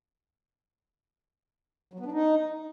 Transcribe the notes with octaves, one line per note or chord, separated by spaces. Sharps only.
F#3
B3
D4
D#4